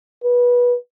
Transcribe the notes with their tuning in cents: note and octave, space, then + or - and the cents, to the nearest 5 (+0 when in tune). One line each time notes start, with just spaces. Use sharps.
B4 -20